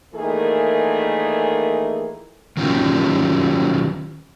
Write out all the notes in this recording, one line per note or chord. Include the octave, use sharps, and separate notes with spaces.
A#2 D#3 E3 A3 G#4 A#4
D#3 F#3 C#4 F4 G4